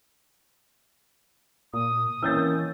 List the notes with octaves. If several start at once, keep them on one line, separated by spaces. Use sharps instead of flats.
A#2 D#6
D#3 E3 A#3 C#4 E6 G6 A6